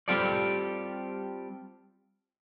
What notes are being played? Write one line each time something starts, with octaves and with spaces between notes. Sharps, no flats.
G3 C4 F4 G4 A4 D5